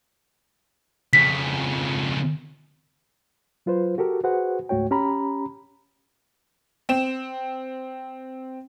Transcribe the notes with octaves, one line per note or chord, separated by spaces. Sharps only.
F2 C#3 B6
F#3 F4 B4 C5
F#4 G4 A4 A#4
F#4 G#4 B4 C5 F#5
C#2 G#2 A3 F#4 C#5 G5
C#4 G4 A#5 B5
C4 E7